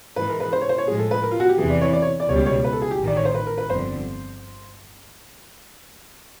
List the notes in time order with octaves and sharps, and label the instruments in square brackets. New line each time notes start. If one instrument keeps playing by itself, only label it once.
[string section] G#2 E3 G#3 [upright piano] B4
[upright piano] A#4
B4
C5
C#5
C5
C#5
[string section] A2 F3 G#3 [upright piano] G#4
[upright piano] A4
B4
A#4
F4
F#4
G4
[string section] E2 C3 E3 [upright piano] G#4
[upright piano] D5
C#5
D5
C#5
D5
[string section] C#2 B2 G3 [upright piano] C#5
[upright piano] C#5
B4
A4
G#4
G4
[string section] A1 G#2 D#3
[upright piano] D5
C#5
C5
B4
A#4
B4
[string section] G1 F2 D3 [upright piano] C5